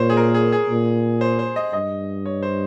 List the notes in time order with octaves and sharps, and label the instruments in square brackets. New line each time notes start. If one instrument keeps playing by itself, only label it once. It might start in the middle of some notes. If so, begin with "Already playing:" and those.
Already playing: [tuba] A#2 [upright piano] C5 C#5
[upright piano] G#4
A#4
G#4
G#4
[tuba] A#2
[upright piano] C5
C5
D#5
[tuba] G2 [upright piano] D#5
[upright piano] C#5
C5